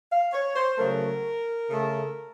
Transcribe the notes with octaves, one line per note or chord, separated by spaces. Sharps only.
F5
C#5
C5
C#3 F#3 A3 A#4
C#3 A3